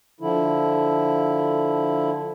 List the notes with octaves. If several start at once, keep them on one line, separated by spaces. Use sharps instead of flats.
D3 F3 E4